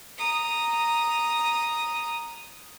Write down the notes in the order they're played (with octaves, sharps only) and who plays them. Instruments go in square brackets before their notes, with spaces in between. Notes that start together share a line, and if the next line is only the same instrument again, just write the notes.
[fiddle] A#5 D#6